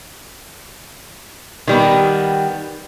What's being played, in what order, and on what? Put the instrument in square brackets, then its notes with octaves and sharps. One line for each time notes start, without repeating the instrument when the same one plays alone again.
[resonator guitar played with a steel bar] D#3 G3 B3